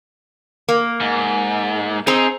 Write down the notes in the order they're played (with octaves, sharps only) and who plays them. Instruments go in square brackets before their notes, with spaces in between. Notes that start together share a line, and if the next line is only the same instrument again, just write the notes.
[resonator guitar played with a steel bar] A#3
[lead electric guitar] G#2
[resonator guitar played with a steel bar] C4 G#4 [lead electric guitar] D#4